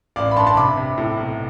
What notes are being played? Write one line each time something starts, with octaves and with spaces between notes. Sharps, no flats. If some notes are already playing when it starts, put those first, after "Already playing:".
A1 D5 F5
B5
G2 A5 C6
A5 C6
C3 B5 D6
C3
A2
B1